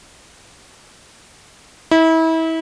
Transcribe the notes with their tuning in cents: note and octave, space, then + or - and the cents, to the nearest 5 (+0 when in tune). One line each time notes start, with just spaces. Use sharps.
E4 -30